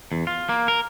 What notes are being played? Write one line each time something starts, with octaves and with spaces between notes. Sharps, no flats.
E2
F4
A#3
A#4